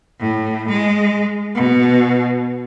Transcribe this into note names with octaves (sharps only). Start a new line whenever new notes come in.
A2
G#3
B2